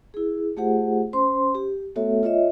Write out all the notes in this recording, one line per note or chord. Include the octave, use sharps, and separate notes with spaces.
E4 G#4
A3 F4 G4 G#4 C5 F#5
C#4 C5 C6
G4
A3 B3 F#4 A4 C#5 E5
F4 C#5 D#5 E5